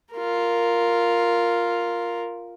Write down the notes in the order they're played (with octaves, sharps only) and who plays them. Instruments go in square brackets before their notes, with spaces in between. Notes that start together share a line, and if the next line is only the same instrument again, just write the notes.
[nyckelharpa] F4 A#4